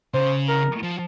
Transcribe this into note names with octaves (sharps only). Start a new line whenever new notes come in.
C#3 C5
A#4
F3